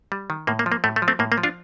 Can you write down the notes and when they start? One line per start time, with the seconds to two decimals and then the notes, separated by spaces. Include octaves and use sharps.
0.12 G3
0.30 D#3
0.47 A2 A#3
0.59 A#3
0.66 F3
0.72 A#3
0.84 A2 A3
0.96 A3
1.02 F3
1.08 A3 C4
1.19 A2 A#3
1.32 A#3
1.38 F3
1.43 D4 F4